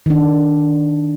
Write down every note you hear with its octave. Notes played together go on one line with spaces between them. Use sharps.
D#3 D4